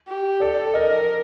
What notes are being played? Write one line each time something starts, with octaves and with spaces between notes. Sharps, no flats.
G4
A4 D5
A#4 D#5